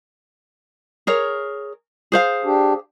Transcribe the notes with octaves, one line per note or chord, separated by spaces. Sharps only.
G#4 A#4 C#5
G#4 C5 F5
D4 G4